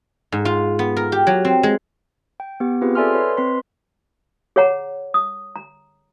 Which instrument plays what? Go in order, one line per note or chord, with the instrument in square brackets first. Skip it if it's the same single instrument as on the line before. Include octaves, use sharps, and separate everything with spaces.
[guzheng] G#2
F4
B3
A#4
G4
F#3
C4
G#3
[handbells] G5
B3 G4
C4 F4 G4 G#4 B4
A4 D5 E5 G#5 C6 F6
B4 C#5 C6
C4 B4 D#5 C6 B6
[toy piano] G#4 C#5 F#5 A#5
D#6
A#5